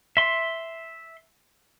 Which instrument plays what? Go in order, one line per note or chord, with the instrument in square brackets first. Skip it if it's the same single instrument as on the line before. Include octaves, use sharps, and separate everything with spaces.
[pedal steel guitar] E5 C6